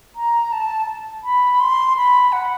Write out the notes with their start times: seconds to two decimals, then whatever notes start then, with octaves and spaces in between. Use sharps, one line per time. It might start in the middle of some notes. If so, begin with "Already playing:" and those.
0.16 A#5
0.52 A5
1.24 B5
1.60 C6
1.97 B5
2.32 F#5